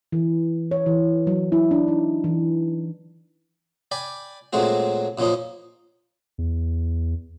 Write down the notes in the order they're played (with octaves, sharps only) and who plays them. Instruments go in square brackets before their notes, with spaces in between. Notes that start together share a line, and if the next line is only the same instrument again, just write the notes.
[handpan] E3
C#5
E3
F#3
E4
D4
D#4
E3
[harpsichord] D5 G5 G#5 B5
A#2 F#3 G#3 A3 C4 F#4
F#2 A#2 F3 C#4 D#4
[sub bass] E2